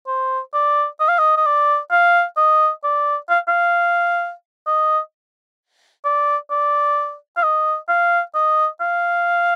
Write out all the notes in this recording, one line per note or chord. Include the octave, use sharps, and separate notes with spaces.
C5
D5
D#5
F5
D#5
D#5
D5
F5
D#5
D5
F5
F5
D#5
D5
D5
F5
D#5
F5
D#5
F5